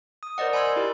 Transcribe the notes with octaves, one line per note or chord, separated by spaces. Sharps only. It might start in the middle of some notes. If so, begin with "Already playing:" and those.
D#6
A#4 C5 D5 D#5 F#5
G#5 B5 C6 E6 G#6
E4 G4 A#4